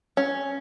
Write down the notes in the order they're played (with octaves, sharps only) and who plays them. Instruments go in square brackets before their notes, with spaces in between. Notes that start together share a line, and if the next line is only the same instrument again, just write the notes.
[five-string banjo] C#4